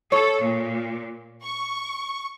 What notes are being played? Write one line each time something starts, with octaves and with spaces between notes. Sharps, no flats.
A4 C#5
A#2
C#6